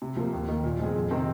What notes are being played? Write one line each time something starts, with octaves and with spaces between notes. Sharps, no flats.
C3
F3 A#3
D#2
D#3 A#3
A#2
F3 G#3 C4 G#4
F2
C3 D#3 C4